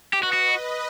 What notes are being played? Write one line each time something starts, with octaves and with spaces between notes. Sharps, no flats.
G4 B4 D#5
F#4
F#4